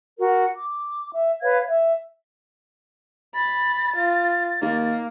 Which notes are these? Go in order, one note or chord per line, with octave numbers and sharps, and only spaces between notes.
F#4 A#4
D6
E5
B4 C#5 F5 G#6
E5
B5 A6
F4
D#2 A#3